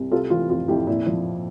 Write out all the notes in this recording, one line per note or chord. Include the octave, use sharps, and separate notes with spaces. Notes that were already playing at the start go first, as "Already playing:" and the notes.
Already playing: C2
C3 F4 A4
E3 F4
F2 F4
F2 E4 G4
A#2 E4
F3